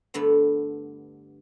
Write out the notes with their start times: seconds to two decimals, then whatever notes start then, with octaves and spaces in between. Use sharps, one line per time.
0.14 G2 D3 A3 B3